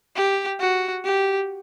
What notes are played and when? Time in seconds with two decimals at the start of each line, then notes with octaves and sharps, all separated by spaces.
0.16 G4
0.60 F#4
1.05 G4